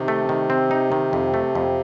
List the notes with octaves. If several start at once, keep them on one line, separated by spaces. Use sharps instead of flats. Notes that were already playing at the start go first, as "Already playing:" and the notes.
Already playing: C3 D#3
A3
D#3
C4
D#4
D#3
F2
A3
F2